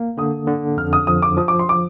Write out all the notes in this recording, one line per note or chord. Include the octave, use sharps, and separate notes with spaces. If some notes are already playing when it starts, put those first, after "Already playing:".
Already playing: A#3
D3 D#6
D3
F2 F6
D#6
F3 D#6
D6
F3 D#6
D6
C6
D6